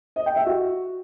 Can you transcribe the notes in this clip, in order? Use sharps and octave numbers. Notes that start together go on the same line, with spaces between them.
D#5
G5
E5
F#4